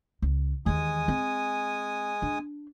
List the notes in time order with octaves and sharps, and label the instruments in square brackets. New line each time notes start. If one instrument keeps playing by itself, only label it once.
[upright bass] C#2
[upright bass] D#2 E3 [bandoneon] G#3 G#5 D#6
[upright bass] C4
D4